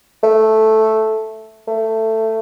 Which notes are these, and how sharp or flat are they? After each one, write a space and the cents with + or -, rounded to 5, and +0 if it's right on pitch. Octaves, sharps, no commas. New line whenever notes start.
A3 -5
A3 +15